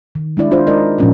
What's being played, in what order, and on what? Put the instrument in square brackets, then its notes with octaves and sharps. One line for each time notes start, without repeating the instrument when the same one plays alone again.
[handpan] D#3
G#3 D4 E4 D5
D4 F4 C5
G#3 D#4 A#4 D5 D#5
A#2 F3 G#3 C#4 F4 A#4